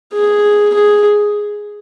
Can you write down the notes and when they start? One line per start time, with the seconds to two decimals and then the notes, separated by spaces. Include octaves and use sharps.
0.13 G#4
0.74 G#4